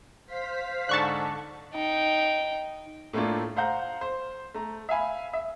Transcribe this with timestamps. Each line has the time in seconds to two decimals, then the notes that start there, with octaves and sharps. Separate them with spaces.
0.26 C5 F5 B6
0.89 G#2 D3 A5 C#6 F#6
1.74 D#4 G5
3.13 A2 A3 A#3 D4 F4
3.56 C5 F5 F#5 A#5 G6
4.01 C5
4.55 A3 A#5
4.89 E5 F5 G#5 B5
5.33 E5